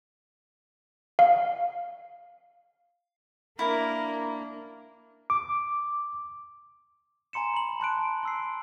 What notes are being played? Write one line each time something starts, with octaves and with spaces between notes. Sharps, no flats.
F5
A#3 D4 E4 A#4
D6
G#5 A#5 C6 C#7 E7
B5 F#7
A5 C6 F#6 D7
C6 E6 C7